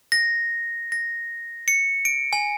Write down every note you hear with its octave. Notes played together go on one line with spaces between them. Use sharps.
A#6
A#6
C#7
D7
G#5